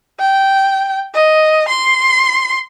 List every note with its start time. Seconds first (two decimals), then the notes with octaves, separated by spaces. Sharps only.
0.19 G5
1.14 D#5
1.68 C6